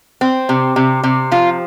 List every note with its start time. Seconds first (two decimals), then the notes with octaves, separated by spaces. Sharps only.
0.21 C4
0.49 C3
0.76 C3
1.04 C3
1.32 F3 F4